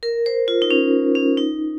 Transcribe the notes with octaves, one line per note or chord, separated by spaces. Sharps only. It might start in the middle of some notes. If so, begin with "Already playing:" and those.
A#4
C5
F4
D#4
C#4
C#4
D#4